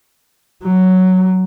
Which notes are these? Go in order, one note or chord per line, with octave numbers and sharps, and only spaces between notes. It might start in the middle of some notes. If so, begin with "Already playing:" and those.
F#3